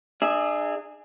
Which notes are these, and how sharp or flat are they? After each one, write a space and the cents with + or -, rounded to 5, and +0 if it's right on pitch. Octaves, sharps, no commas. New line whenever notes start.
D4 +40 G#4 +0 E5 +0